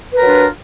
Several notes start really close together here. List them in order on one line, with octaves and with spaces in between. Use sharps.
B4 A#4 F#3 D4 F4